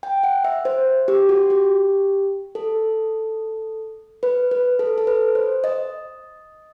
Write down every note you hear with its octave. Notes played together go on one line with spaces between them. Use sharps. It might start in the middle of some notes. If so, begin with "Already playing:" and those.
G5
F#5
E5
C5
G4
F#4
G4
A4
B4
B4
A4
A4
B4
C5
D#5